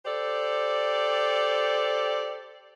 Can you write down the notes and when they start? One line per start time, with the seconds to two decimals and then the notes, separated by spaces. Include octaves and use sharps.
0.05 G4 A4 C5 D5